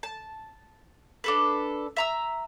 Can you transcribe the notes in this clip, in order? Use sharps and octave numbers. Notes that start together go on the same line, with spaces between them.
A5
D4 A4 B4
E5 A#5 E6